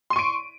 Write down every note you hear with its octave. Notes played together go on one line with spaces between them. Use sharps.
C6 C#6 D7 D#7